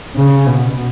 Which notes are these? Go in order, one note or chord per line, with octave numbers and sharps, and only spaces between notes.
C#3
B2